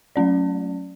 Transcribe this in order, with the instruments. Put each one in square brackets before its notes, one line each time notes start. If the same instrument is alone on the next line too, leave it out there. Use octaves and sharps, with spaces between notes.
[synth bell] F#3 A3 C#4 D5